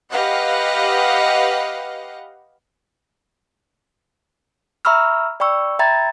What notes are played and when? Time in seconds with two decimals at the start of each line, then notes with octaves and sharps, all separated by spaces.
0.11 G4 B4 D#5 F5 F#5
4.85 E5 A#5 B5 C#6 E6 F6
5.40 D5 G5 B5 C#6 E6
5.79 E5 G5 A#5 B5 G#6 A6